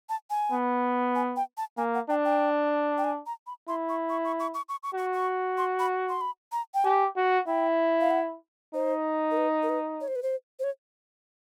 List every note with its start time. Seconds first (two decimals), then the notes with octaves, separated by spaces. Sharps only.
0.09 A5
0.30 G#5
0.52 B3
1.15 G#5
1.36 G5
1.58 A5
1.78 A#3 G#5
1.94 F#5
2.09 D4 G5
2.25 G5
2.98 G5
3.04 G#5
3.26 A#5
3.47 B5
3.68 E4 C6
3.89 C#6
4.10 C#6
4.25 C#6
4.40 C#6
4.54 C#6
4.69 C#6
4.83 C#6
4.95 F#4 C#6
5.13 C#6
5.58 C6
5.79 B5
6.09 C6
6.21 B5
6.52 A#5
6.74 G5
6.85 G4 G#5
7.17 F#4
7.48 E4 G5
8.01 F5
8.11 F#5
8.74 D#4 C5
9.31 A#4
9.37 B4
9.63 A#4
9.69 B4
10.01 C#5
10.08 C5
10.16 B4
10.23 C5
10.59 C5
10.64 C#5